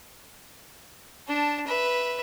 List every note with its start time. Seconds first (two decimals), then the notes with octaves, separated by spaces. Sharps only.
1.28 D4 A5
1.67 B4 E5